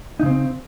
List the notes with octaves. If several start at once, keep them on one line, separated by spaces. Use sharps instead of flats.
C#3 C4 D#4